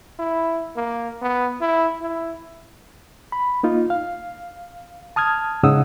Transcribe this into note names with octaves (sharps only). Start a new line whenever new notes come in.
E4
A#3
B3
E4
E4
B5
A#3 D#4 F4
F5
A5 D#6 F6 G#6
G#2 C#3 D#4 F#5 D#6 E6